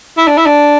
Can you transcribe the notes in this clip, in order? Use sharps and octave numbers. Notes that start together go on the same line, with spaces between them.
E4
D4
E4
D4